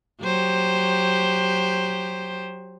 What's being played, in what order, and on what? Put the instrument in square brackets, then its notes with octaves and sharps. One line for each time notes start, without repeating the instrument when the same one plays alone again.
[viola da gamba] F#3 G4 C5